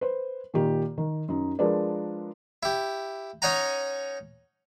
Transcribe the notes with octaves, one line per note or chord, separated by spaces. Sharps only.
B4 C5
A#2 D#3 G4
D#3
F#2 D#4
F3 G#3 D4 A#4 B4 D5
E4 G4
C#4 D#4 C#5 F#5 G#5 A#5